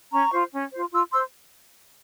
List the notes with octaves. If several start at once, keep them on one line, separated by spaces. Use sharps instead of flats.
C#4 A#5 C#6
F4 C5
C#4
F4 C5
F4 C6 E6
C5 C6 E6